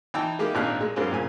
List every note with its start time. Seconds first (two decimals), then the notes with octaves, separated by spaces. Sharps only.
0.14 E3 D#4 G5 A5 E6
0.39 G#3 A#3 D#4 E4 G4
0.55 G#1 A#2 D4 D#4 F5 F#6
0.81 G#3
0.96 G2 F#3 G#3 A#3 C4
1.12 A#2 C#3 G#5